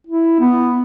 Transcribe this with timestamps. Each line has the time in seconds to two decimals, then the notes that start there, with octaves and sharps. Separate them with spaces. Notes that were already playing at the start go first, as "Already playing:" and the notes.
0.07 E4
0.40 B3